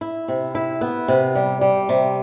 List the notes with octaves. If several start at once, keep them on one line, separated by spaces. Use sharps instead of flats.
E4
C3
E4
B3
C3
G3
G3
C3